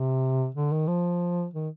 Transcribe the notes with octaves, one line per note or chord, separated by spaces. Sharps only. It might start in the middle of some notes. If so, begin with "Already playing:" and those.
Already playing: C3
D3
D#3
F3
D#3